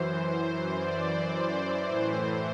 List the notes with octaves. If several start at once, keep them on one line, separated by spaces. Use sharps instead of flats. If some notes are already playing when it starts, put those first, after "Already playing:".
Already playing: F#2 E3 C5
C5
D5
C5
A2 E3 C5